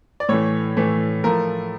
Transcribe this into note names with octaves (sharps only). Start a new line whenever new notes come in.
D5
A2 E3 A3 C#5
A2 E3 A3
A2 F3 A3 A#4